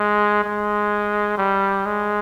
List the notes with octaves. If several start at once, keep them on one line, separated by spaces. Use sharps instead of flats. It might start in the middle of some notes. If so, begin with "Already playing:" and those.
Already playing: G#3
G#3
G3
G#3